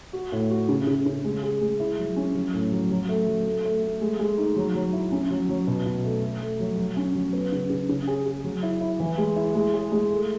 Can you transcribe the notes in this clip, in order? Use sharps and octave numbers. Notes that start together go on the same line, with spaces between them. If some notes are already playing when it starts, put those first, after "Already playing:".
F#4
A2
F#4
C#3
C#3
C#3
G#3
G#4
G#3
E4
F#3
C#4
F#3
A2
F#3
F#3
A3
F#3
A3
A3
A3
G#3
G#3
D#4
F#3
F#3
E4
C#4
F#3
F#3
B2
B2
A3
A3
A3
F#3
F#3
C#4
F#3
B3
C#3
C#3
C#3
G#4
G#4
F#3
E4
E4
E3
G#3
E4
G#3
G#4
G#3
A3